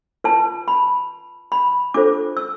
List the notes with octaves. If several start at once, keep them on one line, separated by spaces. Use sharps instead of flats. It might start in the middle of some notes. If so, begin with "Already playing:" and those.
F4 B4 A5
B5
B5
D4 F4 A4 C5 D6
E6